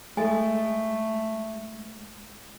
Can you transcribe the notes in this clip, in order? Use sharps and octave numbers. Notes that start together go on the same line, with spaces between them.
G#3 A3 A4 D#5 G#5